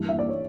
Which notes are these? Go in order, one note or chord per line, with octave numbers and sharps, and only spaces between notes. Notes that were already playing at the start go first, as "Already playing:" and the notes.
Already playing: G2 E3
E5
D5
C#5